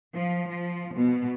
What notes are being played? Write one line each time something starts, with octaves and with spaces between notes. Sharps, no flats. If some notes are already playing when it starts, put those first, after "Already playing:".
F3
F3
B2